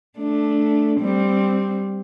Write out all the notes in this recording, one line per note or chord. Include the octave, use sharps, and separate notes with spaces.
A3 D4
G3 C4